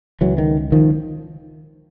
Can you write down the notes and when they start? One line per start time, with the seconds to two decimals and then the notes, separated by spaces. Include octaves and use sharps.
0.21 C#2 C#3 E3 F#3
0.38 D#3
0.72 D#3 F3